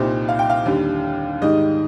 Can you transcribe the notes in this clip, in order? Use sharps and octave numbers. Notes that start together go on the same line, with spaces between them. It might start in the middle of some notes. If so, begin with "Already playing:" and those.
Already playing: C2 A#2 G3 C4 D#4
F5
G5
F5
D#2 D3 G3
G#2 D#3 G3 D#5